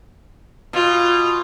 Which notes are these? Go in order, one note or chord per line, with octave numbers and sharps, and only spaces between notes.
B2 F4